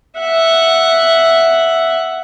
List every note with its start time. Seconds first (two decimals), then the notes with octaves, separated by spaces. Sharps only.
0.19 E5 F#5